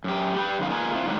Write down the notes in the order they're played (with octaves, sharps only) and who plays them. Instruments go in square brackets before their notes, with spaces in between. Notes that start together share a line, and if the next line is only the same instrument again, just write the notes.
[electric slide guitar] F#2 G4
G3 G4 B4
F#2 D#3 G#3 F5
A#3 F4 G#4 A#4 B4 D#5
C4 E4 F4
A2 D3 D#3 F#3 G#3